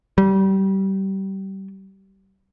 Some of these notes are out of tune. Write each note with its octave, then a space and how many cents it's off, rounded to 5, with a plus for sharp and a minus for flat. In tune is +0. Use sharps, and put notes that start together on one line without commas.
G3 -25